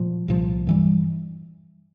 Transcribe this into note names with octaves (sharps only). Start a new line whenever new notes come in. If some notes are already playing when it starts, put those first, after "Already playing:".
Already playing: A#2 F3
C2 A#2 F3
G2 E3 G3